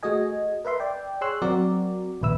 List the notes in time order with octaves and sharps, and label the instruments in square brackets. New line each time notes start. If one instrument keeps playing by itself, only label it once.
[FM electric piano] A3 F#4 G#4 D#5 G#5
A#4 B4 E5 C6
D5 G5
G#4 C#5 C6 E6 F#6
F#3 C4 F#4 A#4 D5
A#1 D#2 C#3 B4 E5 E6